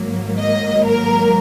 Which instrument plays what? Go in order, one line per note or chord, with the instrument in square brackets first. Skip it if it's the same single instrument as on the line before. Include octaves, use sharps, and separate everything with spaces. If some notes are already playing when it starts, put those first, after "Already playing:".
Already playing: [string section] G#1 G#2 F#3 A#3
D#5
A#4